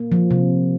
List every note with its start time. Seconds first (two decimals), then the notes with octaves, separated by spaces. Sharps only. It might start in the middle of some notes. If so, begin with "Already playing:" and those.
Already playing: A#3
0.12 F3
0.31 C3